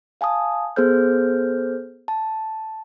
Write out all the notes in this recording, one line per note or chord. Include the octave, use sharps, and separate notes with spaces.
F5 G#5 A5 D#6
B3 G#4 A4 C5 F6 G6
A5